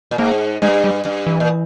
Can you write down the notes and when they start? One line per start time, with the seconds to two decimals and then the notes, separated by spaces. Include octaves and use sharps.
0.11 A#2
0.18 G#2 A#3
0.62 G2 G#3
0.84 G3
1.05 G2
1.27 E3
1.40 A#2